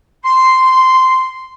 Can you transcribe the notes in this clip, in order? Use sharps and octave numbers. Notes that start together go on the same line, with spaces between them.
C6